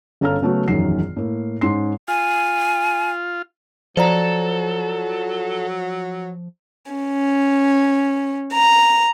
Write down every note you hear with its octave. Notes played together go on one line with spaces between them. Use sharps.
G1 C#4 A4 F5 A#5 F6
C#3 F#3 A3 B3 F#4
E1 A#1 F#2 D#3 F#3 C7
A2 A#3
G#2 C#4 C6 C7
F4 G#5
F3 F#3 A4 C5 D5 A#5
C#4
A#5